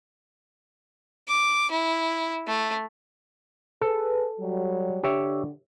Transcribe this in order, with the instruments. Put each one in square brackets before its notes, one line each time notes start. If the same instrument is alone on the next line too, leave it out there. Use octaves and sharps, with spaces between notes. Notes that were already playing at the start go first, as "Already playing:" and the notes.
[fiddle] D6
E4
A3
[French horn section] G#4 B4 [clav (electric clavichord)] A4
[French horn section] F#3 G3
[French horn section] D3 D4 [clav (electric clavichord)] G4 C#5 E5